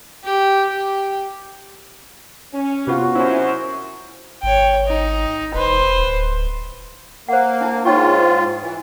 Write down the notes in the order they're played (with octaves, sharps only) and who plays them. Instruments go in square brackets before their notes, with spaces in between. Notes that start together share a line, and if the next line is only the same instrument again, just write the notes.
[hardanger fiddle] G4
G4
[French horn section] C#4
[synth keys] C3 B3 F4 [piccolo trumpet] F#4
[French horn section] F#2 C#4 C5 [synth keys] E4
[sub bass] G#1 [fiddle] C#5 G5
[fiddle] D#4
[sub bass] E1 [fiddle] B4 C5
[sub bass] D1
[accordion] A#3 [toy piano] C5 F#5
[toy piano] D4 E4 A5
[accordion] G#2 F4 [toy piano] C#5 G5 C#6
[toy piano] D4
[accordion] E3